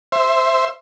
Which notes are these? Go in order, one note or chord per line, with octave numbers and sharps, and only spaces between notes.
C5 E5